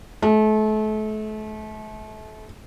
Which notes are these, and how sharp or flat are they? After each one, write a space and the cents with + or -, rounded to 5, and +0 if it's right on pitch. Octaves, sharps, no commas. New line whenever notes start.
A3 -35